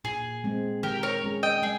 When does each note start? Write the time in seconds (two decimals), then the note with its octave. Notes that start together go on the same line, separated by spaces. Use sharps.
0.04 A#2 G#4
0.44 G#3 C4
0.83 D#3 G4 A#4
1.03 A#4 C#5
1.23 G#3 C#4 G#4
1.43 D#5 G5
1.63 G#3 G#4